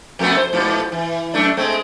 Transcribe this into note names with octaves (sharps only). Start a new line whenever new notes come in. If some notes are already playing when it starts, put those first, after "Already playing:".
F2 A3 B3
C5
G#2 B2 F3
E3
F#2 A3 D4
G#3 A3 C4